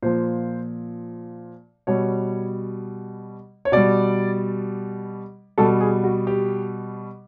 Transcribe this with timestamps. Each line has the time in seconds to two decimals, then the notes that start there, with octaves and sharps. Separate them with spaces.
0.03 A#2 F3 C5
1.87 B2 G3 C#5
3.65 C#5
3.72 B2 G3 D5
5.58 B2 G3 A4
5.80 G#4
6.04 F#4
6.27 G4